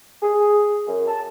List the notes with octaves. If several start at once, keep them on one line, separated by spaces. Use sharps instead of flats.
G#4
F#2
A5